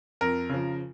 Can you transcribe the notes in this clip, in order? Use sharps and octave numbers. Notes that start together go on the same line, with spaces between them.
F2 A#4
C#3 F3